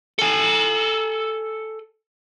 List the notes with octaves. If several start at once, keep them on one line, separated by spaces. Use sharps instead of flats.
A4 G#5